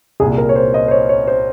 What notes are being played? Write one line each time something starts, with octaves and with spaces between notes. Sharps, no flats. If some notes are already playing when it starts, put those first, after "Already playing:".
C2 A#2 G#4
A#4
C#5
C5
D#5
C5
C#5
C#5
C5